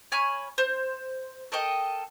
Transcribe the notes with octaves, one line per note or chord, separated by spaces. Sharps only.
C#5 G#5 B5 F6
C5
A4 A#4 D#5 G5